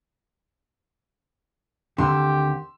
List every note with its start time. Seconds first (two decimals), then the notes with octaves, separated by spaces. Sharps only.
1.98 D2 D3 D#3 C4 G4 C6 E6